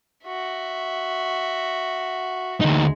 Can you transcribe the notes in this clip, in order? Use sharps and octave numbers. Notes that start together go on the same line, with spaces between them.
F#4 E5
D2 G#3 D#4